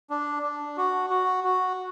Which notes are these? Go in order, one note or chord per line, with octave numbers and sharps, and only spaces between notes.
D4
D4
F#4
F#4
F#4